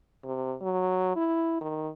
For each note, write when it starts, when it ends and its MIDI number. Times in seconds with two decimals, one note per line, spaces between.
0.24 0.54 48
0.62 1.14 54
1.16 1.61 64
1.61 1.88 51